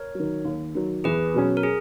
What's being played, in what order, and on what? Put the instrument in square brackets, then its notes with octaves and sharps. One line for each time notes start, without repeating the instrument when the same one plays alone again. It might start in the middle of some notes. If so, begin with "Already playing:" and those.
Already playing: [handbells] A#4 C#5
[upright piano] D#3 F#3
D#2
D#3 F#3
[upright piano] E2 [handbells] G#4 B4
[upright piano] B2 F#3 C#4
[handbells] A#4
G#4